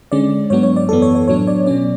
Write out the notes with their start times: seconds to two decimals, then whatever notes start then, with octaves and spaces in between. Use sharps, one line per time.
0.12 D3 G#3 C#4 D5
0.50 G#2 F#3 B3 D4 C#5
0.63 C#5
0.76 D5
0.89 F#2 E3 B3 A4
1.02 C#5
1.15 C#5
1.28 A2 F#3 B3 D4 C#5
1.47 D5
1.66 B2 F#3 C#4 D5